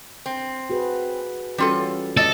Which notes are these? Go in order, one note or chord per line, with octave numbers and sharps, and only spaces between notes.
C4
F#4 G#4 B4
E3 G3 C#4 F4 F#4 A4
G#3 F4 A4 D5 D#5